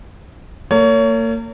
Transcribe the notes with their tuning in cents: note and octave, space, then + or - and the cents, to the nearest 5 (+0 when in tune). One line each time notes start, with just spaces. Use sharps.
A#3 -35 C#5 +25